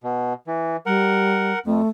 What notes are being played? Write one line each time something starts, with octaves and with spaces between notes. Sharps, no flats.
B2
E3
G3 A#4 F#5
F2 A3